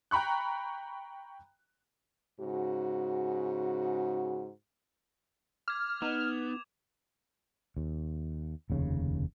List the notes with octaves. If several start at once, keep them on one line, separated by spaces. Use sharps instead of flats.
G5 A#5 B5 C#6 F#6
G#2 C#3 F#4
D6 F6 G#6
B3 D#4 E7 F7
D#2
F1 D#2 C#3